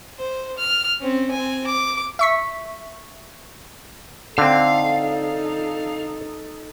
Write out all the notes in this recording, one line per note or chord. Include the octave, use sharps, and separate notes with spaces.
C5
F6
C4 C#4
C4 G#5
D6
E5 C#6 B6
D3 C4 D#4 A4 F5